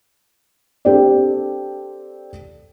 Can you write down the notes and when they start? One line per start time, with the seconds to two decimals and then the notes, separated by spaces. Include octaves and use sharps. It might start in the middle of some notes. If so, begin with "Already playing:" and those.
0.85 C4 D4 G4 A4 D5